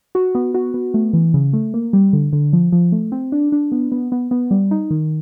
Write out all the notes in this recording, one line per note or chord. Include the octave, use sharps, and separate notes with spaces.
F#4
B3
F#4
B3
A3
E3
C#3
A3
A#3
G3
D3
D3
F3
F3
A3
C4
D4
D4
B3
B3
B3
B3
G3
D#4
D#3